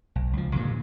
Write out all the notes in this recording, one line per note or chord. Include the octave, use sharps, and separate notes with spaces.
B1
C#2 F3
G2 A#2 D3 E3